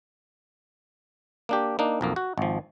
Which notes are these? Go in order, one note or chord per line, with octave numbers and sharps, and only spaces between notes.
A#3 D4 G4
A#3 D4 D#4
B1 F2 A#3
F#4
G#1 F3